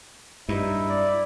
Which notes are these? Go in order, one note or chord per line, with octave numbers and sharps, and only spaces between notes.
G2 D#4 E4
D5